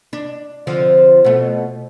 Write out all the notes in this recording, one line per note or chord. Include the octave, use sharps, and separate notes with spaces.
D4
D3 F3 C4
B2 A3